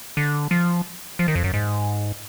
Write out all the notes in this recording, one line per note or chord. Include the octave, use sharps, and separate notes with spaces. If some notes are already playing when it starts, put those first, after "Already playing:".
D3
F3
F3
D#3
F2
F#2
G#2